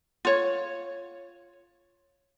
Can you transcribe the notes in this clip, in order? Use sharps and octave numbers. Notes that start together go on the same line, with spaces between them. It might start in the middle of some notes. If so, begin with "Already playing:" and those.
F4 C#5